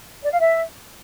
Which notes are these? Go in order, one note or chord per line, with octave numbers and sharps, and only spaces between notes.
D5
F5
E5